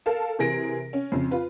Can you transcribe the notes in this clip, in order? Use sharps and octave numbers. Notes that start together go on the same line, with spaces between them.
A4 A#4 F5 A5
C3 E3 G#4 A#4 A#6 D7
C#4
F2 C#3
F4 B4